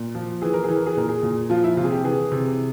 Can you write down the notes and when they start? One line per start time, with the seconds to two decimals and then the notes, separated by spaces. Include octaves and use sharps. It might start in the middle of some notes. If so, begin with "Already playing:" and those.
Already playing: A#2
0.15 F3
0.42 E3 G#4
0.54 A#4
0.64 E3 G#4
0.76 A#4
0.87 G#4
0.97 A#2 A#4
1.09 G#4
1.23 A#2
1.50 F3 F4
1.64 E4
1.77 C3 F4
1.84 G#4
1.91 G4
2.04 E3 G#4
2.32 C3